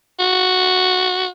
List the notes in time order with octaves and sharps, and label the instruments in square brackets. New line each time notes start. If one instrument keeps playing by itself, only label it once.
[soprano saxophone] F#4